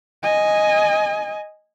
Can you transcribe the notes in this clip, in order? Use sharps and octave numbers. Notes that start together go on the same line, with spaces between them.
D#5 G#5